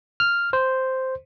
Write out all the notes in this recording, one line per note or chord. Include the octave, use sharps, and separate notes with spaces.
F6
C5